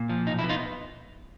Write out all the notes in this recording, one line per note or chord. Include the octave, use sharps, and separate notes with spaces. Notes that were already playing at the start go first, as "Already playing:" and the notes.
Already playing: A#2
F3
B1 D#4
E4
B3
D#4 F4